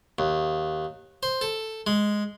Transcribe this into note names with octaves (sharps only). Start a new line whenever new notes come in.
D#2
C5
A4
G#3